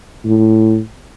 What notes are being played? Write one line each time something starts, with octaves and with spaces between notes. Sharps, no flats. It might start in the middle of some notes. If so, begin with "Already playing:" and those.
A2